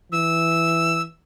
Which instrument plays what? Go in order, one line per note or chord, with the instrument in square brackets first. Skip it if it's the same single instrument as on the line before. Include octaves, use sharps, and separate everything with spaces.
[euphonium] E3 [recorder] E6